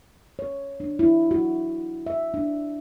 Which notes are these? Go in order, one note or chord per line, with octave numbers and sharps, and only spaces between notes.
C#5
D4
E4
F#4
E5
D4